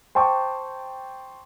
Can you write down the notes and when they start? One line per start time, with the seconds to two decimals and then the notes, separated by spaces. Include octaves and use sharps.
0.15 C5 G5 A5 C#6 D6